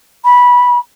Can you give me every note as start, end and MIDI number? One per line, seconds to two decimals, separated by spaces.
0.24 0.78 83